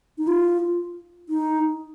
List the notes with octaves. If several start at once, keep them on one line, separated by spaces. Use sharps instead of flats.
D#4
F4
D#4